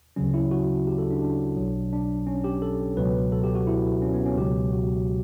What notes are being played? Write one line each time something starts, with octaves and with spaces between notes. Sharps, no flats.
D2 C#3 F#3 C#4
E4
F#4
G4
A4
D4
D4
B1 B2 F#3
D4
C#4
G4
A4
C#2 B2 F#3 B4
A4
G4
F#4
E4
C#4
B3
C#4
C#2 B2 F#3 G4
F#4